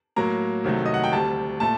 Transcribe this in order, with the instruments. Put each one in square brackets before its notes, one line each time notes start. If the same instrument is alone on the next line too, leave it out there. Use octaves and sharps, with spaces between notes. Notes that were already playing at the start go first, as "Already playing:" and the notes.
[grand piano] A2 F#3 A#3 A#5
C2 C3 D#3 F#3 A3
D#5
F#5
G5
D2 C3 G3 A5
A#2 A3 A5